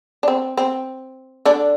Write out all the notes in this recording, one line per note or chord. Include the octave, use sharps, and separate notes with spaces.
D4
C4
C4
D3 D4